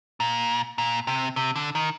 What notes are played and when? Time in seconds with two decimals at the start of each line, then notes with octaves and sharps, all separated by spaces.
0.20 A#2
0.78 A#2
1.07 C3
1.36 C3
1.56 D3
1.75 D#3